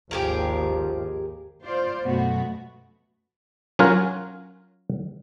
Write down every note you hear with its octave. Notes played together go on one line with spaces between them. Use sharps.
G#1 D#2 F3 G4 G#4 A#4
F4 C5 D5
F#2 B2 A3 B3 F#4
F#3 C#4 F4 F#4 A#4 G#5